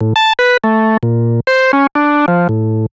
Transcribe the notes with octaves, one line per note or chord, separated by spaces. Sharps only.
A2
A5
B4
A3
A#2
C5
C#4
D4
F3
A2